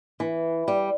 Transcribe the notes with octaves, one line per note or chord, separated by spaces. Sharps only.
E3
G3